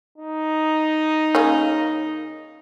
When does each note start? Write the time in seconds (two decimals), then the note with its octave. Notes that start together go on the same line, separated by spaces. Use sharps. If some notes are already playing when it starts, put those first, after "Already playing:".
0.18 D#4
1.35 C#3 A#3 C#4